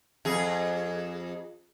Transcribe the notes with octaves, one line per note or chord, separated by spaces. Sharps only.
F2 G#4